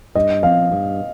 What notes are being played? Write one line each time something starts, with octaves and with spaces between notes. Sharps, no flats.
G2 D#5
F3 C4 F5
G2